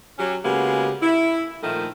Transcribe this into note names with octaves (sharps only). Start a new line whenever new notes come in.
F#3 C#4 G4
C#3 G#3 A#3 B3 F#4 G4
E4
A#2 D#3 F3 A3